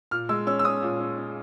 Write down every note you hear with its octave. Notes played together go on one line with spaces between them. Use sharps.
A#2 F6
G#3 E6
C#4 E6
E6
C#4 D#6
A#2
C#4
C#4